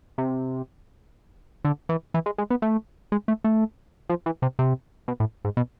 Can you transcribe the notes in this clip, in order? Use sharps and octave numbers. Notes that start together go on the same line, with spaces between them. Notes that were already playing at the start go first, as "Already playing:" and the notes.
C3
D3
E3
E3
G#3
G#3
B3
A3
G#3
A3
A3
F3
E3
C3
C3
B2
A2
G#2
B2